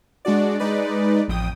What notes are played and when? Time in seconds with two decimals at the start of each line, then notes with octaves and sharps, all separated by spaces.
0.25 G#3 D4 F#4 D5
0.59 G#3 D#4 B4 D5
1.28 A1 F2 G5 D#6